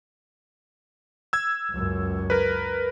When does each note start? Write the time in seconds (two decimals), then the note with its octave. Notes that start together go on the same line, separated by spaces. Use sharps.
1.33 E6 G#6
1.71 C#2 F#2
2.30 A#4 B4